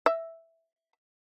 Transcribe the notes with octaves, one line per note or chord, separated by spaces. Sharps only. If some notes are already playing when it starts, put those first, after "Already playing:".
E5